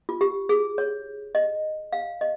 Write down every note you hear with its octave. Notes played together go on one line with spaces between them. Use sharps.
F4
G4
G#4
C#5
D#5
F5
D#5